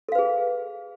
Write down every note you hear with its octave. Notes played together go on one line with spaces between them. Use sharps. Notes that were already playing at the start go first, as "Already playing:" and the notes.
G#4 A4 B4 F5